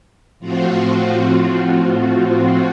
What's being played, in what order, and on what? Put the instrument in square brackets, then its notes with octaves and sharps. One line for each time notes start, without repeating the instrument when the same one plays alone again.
[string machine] A2 F3 C4 F4 F#4